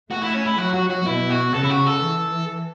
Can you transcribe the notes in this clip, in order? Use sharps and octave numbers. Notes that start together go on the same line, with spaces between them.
A3 F#4
E4
C#4
E4
F#3 F#4
F#4
F#4
B2 E4
F#4
C#3 A4
E4
F#4
A4
E3